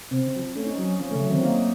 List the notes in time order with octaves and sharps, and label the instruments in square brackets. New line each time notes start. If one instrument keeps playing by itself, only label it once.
[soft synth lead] C3 [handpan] C4
[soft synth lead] C#3
F#3
F3
[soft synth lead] A3 [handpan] C#4
[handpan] D#4
[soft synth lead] F#3 [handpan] C#4
[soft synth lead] F3 [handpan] C#4
[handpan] A3
[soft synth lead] C#3
[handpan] F#3
[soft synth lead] D#3 [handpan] C4
[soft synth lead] A#3 [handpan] D#4